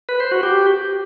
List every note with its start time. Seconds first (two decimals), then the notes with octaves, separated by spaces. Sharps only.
0.09 B4
0.20 C5
0.32 F#4
0.43 G4